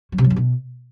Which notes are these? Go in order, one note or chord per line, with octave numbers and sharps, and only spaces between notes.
F#3
C3
F#3
F#2
B2